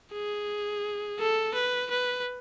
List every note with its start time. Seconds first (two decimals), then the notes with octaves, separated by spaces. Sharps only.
0.13 G#4
1.19 A4
1.55 B4
1.91 B4